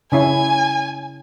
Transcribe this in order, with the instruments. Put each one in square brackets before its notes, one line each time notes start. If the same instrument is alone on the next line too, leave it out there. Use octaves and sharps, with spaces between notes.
[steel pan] C#3 C#4 E4 [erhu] G#5